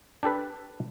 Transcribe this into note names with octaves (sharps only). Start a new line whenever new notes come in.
D4 G4 A4 B4